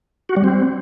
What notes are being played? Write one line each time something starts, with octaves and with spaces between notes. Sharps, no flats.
F#4
G3
C4